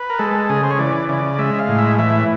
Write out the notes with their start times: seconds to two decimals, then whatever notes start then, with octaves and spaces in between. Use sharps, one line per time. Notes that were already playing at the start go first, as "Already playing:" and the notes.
Already playing: B4
0.10 A#4
0.19 G#3 A4
0.50 C#3 G#4
0.63 C5
0.71 C#5
0.79 E3 D5
1.08 C#3 D5
1.39 G#3 E5
1.59 F5
1.68 A2
1.78 E5
1.98 E3 E5